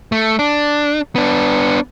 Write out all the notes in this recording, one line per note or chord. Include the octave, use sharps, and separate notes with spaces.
A3
D4
B3 D4